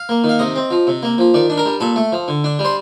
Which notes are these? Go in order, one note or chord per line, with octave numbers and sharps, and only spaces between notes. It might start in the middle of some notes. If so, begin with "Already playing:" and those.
Already playing: F5
A#3
D#3
F5
C3 D#5
C4
F3
C3
A#3
F3
D#3 D5
D4
A#4
G3
A#2 A4
A3
F3
D3
D4
G3
C5